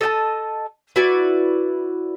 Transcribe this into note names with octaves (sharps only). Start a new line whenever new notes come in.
A4 D#5 G5 A5
E4 F#4 B4 D5